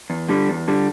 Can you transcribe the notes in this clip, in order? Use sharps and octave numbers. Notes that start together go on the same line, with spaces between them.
E2
D3 G3
E2
D3 G3